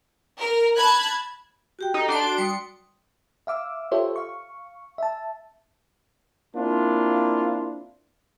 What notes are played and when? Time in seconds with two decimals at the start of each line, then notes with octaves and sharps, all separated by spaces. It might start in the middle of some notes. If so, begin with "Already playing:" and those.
0.37 A#4
0.75 A5 B5 F#6 G#6
1.79 F#4 G4 G5
1.94 D#4 A4
2.09 D4 F#5 C6 D7
2.22 F#4
2.38 G3 C6 D#6 C#7
3.47 E5 F5 D6 E6
3.92 F4 G4 A4 C5 C#5 E5
4.16 F5 C#6
4.98 E5 A5
6.56 A#3 C4 D4 E4 F4